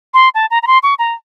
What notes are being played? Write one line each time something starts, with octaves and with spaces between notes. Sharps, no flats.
C6
A5
A#5
A#5
C6
C#6
A#5